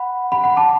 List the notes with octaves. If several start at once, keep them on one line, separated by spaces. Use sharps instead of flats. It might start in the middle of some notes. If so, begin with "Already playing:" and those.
Already playing: F#5 B5
F#5 B5
F#5 B5
A5 D6